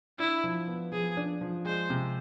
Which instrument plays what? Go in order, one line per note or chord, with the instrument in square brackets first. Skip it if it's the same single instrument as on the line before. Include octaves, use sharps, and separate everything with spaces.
[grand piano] D4 [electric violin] E4
[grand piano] F3
B3
[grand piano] F3 [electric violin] G#4
[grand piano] D4
F3
[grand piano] G#3 [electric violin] C5
[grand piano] C3